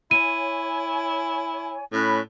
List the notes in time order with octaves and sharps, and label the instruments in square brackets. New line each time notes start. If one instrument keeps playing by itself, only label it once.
[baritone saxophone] E4 [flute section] C#5 G#5 [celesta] D#7
[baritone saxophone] A2 [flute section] C#4 B5 F#6